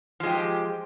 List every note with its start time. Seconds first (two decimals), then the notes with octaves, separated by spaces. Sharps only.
0.20 F3
0.23 G#3
0.27 G4